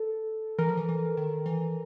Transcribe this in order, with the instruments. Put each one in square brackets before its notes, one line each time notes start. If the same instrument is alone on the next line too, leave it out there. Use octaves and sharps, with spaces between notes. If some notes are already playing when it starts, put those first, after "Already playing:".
Already playing: [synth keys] A4
[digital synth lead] E3 [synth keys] A#4
[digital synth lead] F3
E3
E3
D#3
E3